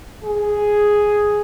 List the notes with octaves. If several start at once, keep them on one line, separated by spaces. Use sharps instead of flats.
G#4